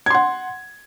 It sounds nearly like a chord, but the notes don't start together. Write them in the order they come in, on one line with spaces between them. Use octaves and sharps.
G#6 C6 F#5